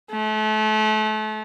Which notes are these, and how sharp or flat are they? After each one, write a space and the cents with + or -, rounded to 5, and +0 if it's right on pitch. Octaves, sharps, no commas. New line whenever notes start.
A3 -35